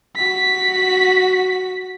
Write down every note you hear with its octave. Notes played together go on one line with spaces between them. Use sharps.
F#4 B6